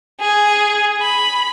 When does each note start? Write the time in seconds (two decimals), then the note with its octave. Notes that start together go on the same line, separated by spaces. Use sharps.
0.20 G#4
1.02 B5